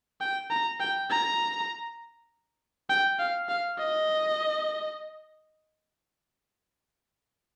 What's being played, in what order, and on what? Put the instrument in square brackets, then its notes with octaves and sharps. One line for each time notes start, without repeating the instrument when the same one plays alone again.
[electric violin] G5
A#5
G5
A#5
G5
F5
F5
D#5